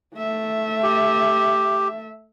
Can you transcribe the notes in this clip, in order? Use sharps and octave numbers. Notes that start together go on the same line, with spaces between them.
A3 E5
G4